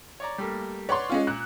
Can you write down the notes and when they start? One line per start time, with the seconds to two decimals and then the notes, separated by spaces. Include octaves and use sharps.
0.20 C#5 D5 A#5
0.38 G3 A3 A#3
0.89 B4 C#5 D5 F#5 C6
1.10 G#3 C#4 F4
1.27 A#2 F#6